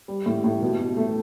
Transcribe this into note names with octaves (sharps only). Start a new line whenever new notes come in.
G3
A2
A2
B2
B2
A3